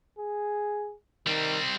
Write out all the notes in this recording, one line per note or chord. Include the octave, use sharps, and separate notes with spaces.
G#4
D#3 G3 C4